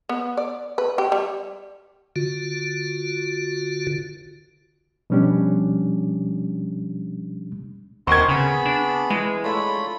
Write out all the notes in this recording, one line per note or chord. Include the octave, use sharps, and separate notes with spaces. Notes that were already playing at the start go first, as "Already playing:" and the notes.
B3
D5
B4
G4
G3
D3 F4 F#4
B2 F3 G3 C#4 D4 G4
D#2 C4 A#4 D#5 F#5 C6 C#6 G#6
C#3 B3 G#4 B5
D4
E3 G#3
A3 D4 E4 F4 C#5 B5